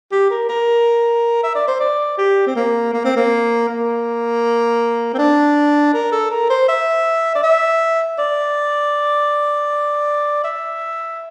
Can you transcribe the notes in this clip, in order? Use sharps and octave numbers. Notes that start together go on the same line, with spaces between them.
G4
A#4
A#4
E5
D5
C5
D5
G4
C4
A#3
A#3
C4
A#3
A#3
C4
D4
A#4
A4
A#4
C5
E5
D5
E5
D5
E5